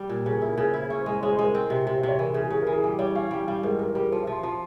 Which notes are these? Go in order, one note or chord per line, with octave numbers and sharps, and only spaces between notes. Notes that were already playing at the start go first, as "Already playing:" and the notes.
Already playing: G3
A#2
C#3 A#4
E4 G#4
A#4
C#3 G#4
E4 C5
E5
C#4 E5
C5
G#3
C5
G#3 C#5
C5
G#3
A#4
C4
C3
C3 C5
E5
C3
C#5
E3 A#4
G#4
C#3
G#4
C#3 G#4
E3 A#4
G#4
G3 G4
G3 C#5
C#4 F5
G3 G5
G3 F5
G#2 A#4
G#2 A#4
G3 A#4
F3 C5
F3 E5
C6
F3 C6